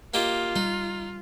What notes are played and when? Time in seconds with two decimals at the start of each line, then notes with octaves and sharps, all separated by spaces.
0.14 A#3 F4 G4 D#5
0.56 G3 D#4